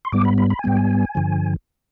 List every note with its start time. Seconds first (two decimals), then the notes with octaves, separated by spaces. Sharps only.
0.05 C6
0.12 G#2 G3 B3 D6
0.25 B5
0.38 B5
0.50 B5
0.59 G#5
0.64 G#2 G3 B3 G5
0.77 G#5
1.15 G2 D3 F3